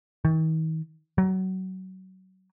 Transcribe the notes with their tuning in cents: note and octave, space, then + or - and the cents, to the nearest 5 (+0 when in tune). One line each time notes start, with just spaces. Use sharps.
D#3 +40
F#3 +25